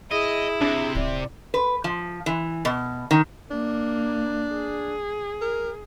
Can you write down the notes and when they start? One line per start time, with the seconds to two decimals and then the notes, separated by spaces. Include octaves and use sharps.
0.11 E4 G#4 D#5
0.61 C3 D4
0.95 D1 D5
1.54 B4
1.84 F3
2.26 E3
2.65 B2
3.11 D#3
3.51 A#3 D4
4.53 G#4
5.42 A#4